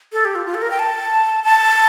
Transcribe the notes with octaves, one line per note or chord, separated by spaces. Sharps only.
A4
G4
F4
F4
A4
A#4
G5
A5
A5